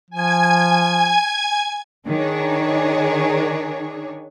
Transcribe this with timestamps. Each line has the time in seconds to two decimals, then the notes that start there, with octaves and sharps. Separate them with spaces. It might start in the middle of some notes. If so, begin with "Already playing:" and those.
0.11 F3 G#5 G#6
2.08 D#3 D4 G#4 C#5